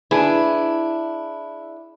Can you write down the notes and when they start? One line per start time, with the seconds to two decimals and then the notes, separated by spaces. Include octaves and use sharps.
0.11 D4 E4 G#4 B4